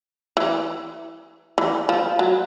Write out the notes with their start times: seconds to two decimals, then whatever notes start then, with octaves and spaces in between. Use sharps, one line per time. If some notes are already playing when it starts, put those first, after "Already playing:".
0.37 E3
1.58 E3
1.89 F3
2.19 F#3